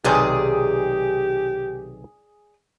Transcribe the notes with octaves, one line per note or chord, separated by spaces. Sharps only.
B1 C3 D#3 G4 G#4 D5